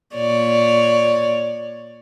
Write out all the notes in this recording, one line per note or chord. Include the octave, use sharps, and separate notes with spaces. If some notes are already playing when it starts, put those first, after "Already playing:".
A#2 C#5 D5